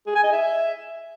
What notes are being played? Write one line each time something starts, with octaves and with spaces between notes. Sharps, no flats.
G#4
G#5
D#5
E5